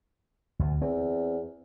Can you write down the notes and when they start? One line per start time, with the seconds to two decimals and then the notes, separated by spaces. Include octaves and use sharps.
0.59 D2
0.82 E2 C4